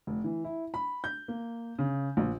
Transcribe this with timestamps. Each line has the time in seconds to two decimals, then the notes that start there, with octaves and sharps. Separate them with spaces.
0.07 F1
0.24 E3
0.44 E4
0.74 B5
1.04 G6
1.28 A#3
1.79 C#3
2.17 A#1